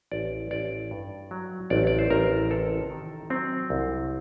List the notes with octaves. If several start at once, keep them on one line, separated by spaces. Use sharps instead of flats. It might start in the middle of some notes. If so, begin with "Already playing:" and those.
A1 D5
A1 D5
G2
F#3
A1 D5
D5
C5
A1 A#4
C3 A4
D#3
F#3 C4
C2